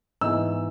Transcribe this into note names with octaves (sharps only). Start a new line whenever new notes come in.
G#2 E3 G#3 B3 E6